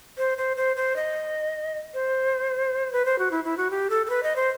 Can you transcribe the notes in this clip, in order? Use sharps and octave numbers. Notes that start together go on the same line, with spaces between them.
C5
C5
C5
C5
D#5
C5
B4
C5
F#4
E4
E4
F#4
G4
A4
A4
B4
D#5
C5